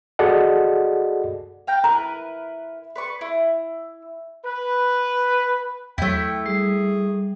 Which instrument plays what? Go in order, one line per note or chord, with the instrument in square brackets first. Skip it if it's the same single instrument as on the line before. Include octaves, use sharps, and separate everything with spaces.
[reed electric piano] F#4 G#4 A4 D5 D#5 F#5
[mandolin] F5 G5 A#5
[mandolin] E4 A#4 B4 [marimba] A#5
[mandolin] B4 D5 C#6
E4
[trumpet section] B4
[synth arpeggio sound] E2 F#3 [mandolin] A3 E4 [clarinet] G5
[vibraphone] G3 [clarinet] G#4